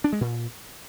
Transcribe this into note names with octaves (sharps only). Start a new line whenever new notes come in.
D4
G#3
A#2